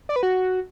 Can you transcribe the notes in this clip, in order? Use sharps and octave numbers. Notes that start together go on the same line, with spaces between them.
D5
B4
F#4